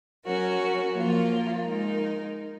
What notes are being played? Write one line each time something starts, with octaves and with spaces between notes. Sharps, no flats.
F#3 C#4 F#4 A#4
F3 A#3 F4 A#4
G#3 D#4 A#4